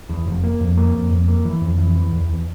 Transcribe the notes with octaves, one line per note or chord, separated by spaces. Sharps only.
E2
F1
A#3
F2
A#3
F2
F2
A#3
E3
F2
E3
E3
E2
E2